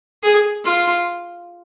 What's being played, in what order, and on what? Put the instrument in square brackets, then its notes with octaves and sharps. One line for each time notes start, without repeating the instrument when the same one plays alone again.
[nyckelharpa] G#4
F4